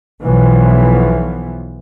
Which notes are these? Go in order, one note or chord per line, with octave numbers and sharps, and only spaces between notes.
B1 B2 E3 F3 B3